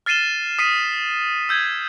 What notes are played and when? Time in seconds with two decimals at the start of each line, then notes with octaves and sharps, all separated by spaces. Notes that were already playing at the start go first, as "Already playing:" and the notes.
0.06 F6 A6 C7 D#7 E7 G7
0.59 D#6 B6 C7 D#7 E7
1.49 E6 G6 G#6